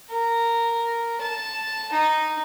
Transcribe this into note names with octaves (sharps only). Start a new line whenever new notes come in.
A#4
A5
D#4